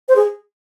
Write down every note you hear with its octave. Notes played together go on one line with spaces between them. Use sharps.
C5
G#4